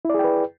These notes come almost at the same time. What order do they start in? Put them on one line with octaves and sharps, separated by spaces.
E4 D5 G#4 G5 B4